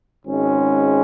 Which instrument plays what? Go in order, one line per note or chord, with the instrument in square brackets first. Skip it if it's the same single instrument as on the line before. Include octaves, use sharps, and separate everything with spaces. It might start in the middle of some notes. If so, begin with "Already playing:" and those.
[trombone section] G#1 G#2 G#3 C#4